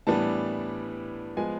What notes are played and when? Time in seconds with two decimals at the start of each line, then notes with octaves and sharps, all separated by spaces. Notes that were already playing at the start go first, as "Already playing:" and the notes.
0.07 A2 E3 G3 B3 D4 A5
1.37 F3 G#3 B3 G#5